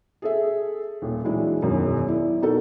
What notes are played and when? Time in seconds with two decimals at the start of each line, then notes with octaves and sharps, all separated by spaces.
0.22 G#4 A4 E5
1.02 D#1
1.24 E3 F#3 G#3 D4 E4
1.62 E1 F#2 D#3
2.07 E4 D5
2.42 B2 D#4 F#4 A4 A#4